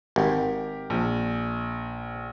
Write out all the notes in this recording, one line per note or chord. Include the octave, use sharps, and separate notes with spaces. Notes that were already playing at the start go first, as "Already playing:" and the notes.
G#1 G4 A#4
A#1